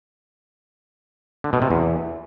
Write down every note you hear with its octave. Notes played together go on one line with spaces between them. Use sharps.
D3
B2
C3
E2